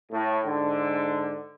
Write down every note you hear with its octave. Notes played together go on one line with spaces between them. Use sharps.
A2
G#2 D3